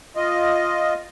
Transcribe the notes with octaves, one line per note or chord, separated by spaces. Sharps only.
F4 D#5